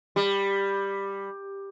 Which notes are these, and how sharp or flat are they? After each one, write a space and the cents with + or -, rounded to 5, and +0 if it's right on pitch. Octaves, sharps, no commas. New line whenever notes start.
G3 +10